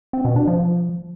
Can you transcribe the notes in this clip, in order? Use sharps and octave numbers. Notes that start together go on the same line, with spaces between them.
C4
B2
D4
F3